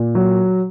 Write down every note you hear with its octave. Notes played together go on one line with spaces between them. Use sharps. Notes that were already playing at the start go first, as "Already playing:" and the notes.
Already playing: A#2
F#3